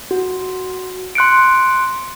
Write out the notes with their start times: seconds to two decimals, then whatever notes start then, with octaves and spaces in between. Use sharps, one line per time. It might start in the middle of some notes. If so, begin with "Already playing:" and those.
0.11 F#4
1.15 C6 F#6 C#7 D7